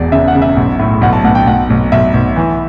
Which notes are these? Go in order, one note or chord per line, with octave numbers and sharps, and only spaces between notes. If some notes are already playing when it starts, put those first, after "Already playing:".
Already playing: E1 E2 D5
C#3 E5
F#5
C#3
E5
B1
A2
B1 F#5
A5
B1 F#5
G5
B1 F#5
B1
B1 E5
B1
E3